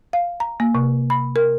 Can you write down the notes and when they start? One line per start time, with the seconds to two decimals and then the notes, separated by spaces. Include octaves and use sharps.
0.13 F5
0.40 A#5
0.60 A#3
0.75 C3
1.10 B5
1.36 A#4